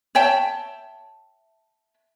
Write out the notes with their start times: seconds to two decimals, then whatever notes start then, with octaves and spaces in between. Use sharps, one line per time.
0.15 C#5 E5 G5 A5